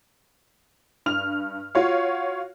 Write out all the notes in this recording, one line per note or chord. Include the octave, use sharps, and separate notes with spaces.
G2 F6 F7
F4 F#4 C#5 F5